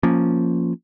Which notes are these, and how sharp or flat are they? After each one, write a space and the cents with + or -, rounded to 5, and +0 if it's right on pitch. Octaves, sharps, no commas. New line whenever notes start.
F3 +0 A#3 +0 C#4 +0